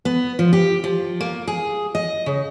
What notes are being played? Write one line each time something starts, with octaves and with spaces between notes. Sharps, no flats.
B3
F3
G4
F3
A#3
G#4
D#5
C#3